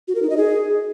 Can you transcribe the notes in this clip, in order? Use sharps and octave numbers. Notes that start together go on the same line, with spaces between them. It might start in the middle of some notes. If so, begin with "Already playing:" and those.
F#4
A#4
D#4
D#5
G#4